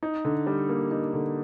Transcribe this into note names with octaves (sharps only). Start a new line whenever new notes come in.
D#4
D3
G3
A#3
D#4
D3